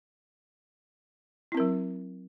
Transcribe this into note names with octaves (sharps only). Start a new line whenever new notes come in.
F#3 C4 E4 A#4